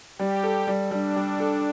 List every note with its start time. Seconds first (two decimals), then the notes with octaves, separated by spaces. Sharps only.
0.19 G3 G4
0.44 A4
0.67 G3
0.91 G3 D4
1.16 G3
1.40 A4